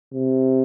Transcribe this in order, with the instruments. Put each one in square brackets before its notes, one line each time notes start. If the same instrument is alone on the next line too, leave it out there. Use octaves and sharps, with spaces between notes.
[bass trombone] C3